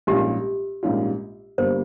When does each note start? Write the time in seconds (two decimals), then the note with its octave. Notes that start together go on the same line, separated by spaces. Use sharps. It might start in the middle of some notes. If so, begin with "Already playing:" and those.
0.07 A#1 G#2 G3 C#4 F4 G4
0.83 A#1 G#2 G3 C#4 F4
1.58 G1 G2 G3 A#3 C5